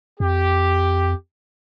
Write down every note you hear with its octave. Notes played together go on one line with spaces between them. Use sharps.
F2 G4